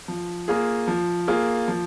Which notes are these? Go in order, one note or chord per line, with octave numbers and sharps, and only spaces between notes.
F3
A#3 F4 G#4
F3
A#3 F4 G#4
F3